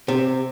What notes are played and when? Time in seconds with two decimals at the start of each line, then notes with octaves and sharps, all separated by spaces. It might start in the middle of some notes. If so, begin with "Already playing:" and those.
0.08 C3